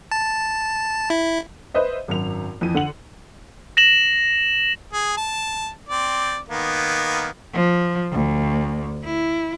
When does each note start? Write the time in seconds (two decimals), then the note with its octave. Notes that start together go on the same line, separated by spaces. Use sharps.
0.11 A5
1.10 E4
1.74 B4 C5 D#5 E5
2.08 G#1 F#2 F7
2.61 F2 E3 D#7
2.74 D3 F#5 F#7
3.77 A#6 E7 F#7
4.93 G#4
5.17 A5
5.89 C4 D5
6.49 D#3 A#3 B3
7.54 F3
8.12 D2
9.05 E4